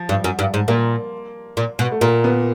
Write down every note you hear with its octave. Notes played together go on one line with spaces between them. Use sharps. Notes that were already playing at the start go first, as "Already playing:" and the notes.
Already playing: F3
G2
F#2
G2
G#2
A#2 A#3
A#2
B2
A3
A#2 A#3
B3